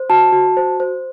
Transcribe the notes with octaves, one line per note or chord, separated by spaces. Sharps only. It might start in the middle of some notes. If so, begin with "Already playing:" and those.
Already playing: C5
F#4 A5
F#4
C5
C5